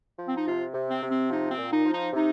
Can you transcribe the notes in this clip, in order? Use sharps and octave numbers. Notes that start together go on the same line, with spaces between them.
F3
C4
D#4
C3 F4
C3
C4
C3
C4
F3 D#4
C4
A#2
D#4
F3
D#4
C3 D#4